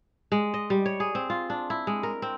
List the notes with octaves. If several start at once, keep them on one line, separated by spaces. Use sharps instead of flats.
G#3
D#5
G3
C#5
G#4
C4
F4
D4
E4
G#3
A#4
C4